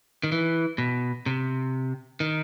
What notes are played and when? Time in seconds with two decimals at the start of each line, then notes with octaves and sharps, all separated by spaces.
0.23 D#3
0.32 E3
0.78 B2
1.26 C3
2.20 D#3